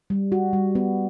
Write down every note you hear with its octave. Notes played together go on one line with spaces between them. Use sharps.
G3
F#4
G3
B3